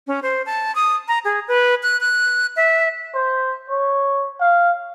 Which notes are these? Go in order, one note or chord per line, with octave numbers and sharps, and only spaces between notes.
C#4
C5
A5
D#6
A#5
G#4
B4
F#6
F#6
E5
C5
C#5
F5